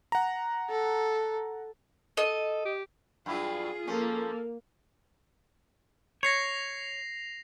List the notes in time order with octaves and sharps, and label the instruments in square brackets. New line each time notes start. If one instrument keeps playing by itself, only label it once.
[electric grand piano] F#5 A#5
[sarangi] A4
[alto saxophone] A4 [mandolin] D#5
[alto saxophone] G4
[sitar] G2 F#3 E4 [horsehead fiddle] F4 G#4
[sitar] F3 C#4 [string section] A#3 [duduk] A4
[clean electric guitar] C#5 [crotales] A#6 C7 F7